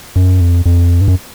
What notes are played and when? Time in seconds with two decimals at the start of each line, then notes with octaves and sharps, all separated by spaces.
0.16 F#2
0.41 F2
0.66 F2
1.01 G2
1.08 F#2